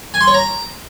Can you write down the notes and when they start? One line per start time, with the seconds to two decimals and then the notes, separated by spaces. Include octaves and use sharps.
0.14 G#5
0.21 C6
0.27 C#5
0.34 A#5